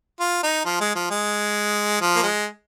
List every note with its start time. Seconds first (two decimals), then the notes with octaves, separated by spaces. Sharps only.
0.20 F4
0.43 D#4
0.65 F3
0.81 G#3
0.95 F3
1.11 G#3
2.01 F3
2.16 A#3
2.23 G#3